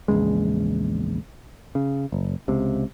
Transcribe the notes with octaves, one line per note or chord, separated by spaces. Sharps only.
A#1 E2 C#3 G#3
C#3
F#1
C#2 C3